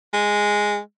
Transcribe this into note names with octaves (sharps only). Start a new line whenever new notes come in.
G#3